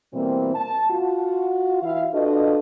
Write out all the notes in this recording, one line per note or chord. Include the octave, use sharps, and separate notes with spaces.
B2 E3 G3 A#3 C4
A5
F4 F#4
E3 E4 E5 F5
D4 F4 F#4 A4 B4 D#5